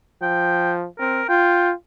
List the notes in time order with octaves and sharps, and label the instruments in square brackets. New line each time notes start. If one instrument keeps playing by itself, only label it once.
[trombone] F3 [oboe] G5
[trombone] C4 [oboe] A#4
[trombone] F4 [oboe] G5